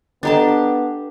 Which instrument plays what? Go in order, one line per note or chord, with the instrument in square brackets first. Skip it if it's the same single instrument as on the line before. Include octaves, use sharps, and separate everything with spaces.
[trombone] B3 [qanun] D4 G4 A5 [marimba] A4 D#5 A#5